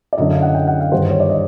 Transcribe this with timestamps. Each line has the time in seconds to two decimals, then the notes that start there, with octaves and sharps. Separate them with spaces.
0.13 D5
0.18 F#2 D3 F#3 D#5
0.31 F5
0.43 F#5
0.55 G5
0.68 F#5
0.80 F5
0.92 G2 D#3 G3 C5
1.11 C#5
1.20 D5
1.30 D#5